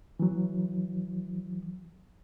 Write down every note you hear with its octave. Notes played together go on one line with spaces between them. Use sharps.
E3 F#3